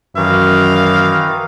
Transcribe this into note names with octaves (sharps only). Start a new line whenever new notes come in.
F#2 D#3 E3 F5